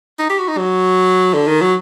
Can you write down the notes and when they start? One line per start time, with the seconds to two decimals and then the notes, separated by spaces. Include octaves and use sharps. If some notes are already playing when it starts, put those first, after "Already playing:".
0.19 D#4
0.29 G4
0.39 F#4
0.48 D#4
0.58 F#3
1.34 D3
1.47 D#3
1.61 F#3